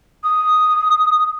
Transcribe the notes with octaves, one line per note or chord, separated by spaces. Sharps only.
D#6